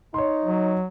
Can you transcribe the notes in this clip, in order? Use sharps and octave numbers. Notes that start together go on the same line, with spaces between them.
D#4 C#5 C6
F#3